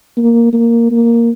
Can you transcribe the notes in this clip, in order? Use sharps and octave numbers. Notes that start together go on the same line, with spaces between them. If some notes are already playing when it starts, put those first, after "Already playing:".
A#3
A#3
A#3